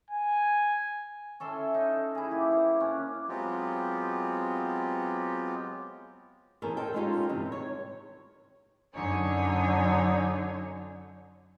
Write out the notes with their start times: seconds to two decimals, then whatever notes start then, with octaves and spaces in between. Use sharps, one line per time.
0.11 G#5
1.40 C#4 A4 E5 C6
1.74 D#4
2.15 E4 G#4
2.31 A#3 G4
2.52 C5
2.80 C#4 D4
3.29 F#3 G#3 B3 C4 F4 G4
6.62 E2 B2 C#4 A4 A#4
6.77 A4 C5 D#5 G5
6.94 G#3 C#4 D#4 F4 G4 A4
7.29 G2 C3 E3
7.52 D#3 C#5
8.95 F#2 D3 D4 D#4 C#5 G#5